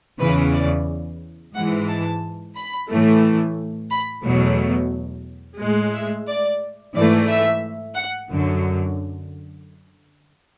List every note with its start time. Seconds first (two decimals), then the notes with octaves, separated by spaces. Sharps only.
0.19 E2 C#3 E3 B4
0.53 D5
1.54 G#2 E3 G#3 F#5
1.88 A5
2.55 B5
2.89 A2 E3 A3
3.90 B5
4.24 E2 B2 F#3 A3
5.59 A2 G#3
5.93 E5
6.27 D5
6.94 G#2 E3 A3 D5
7.28 E5
7.95 F#5
8.29 F#2 D3 F#3